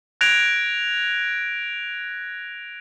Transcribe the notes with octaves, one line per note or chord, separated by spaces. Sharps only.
F#6 G#6 A#6 D7 F7